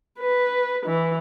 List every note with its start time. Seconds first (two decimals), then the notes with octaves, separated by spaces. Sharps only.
0.19 B4
0.86 E3